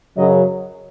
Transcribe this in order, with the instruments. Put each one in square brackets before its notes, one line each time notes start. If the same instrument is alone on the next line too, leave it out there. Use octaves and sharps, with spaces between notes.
[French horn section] F#2 C#3 F#3 D#5